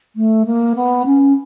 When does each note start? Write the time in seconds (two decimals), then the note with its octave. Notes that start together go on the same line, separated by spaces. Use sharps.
0.16 A3
0.46 A#3
0.75 B3
1.06 C#4